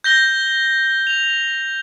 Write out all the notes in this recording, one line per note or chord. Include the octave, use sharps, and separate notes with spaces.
G6 A#6 G7
F7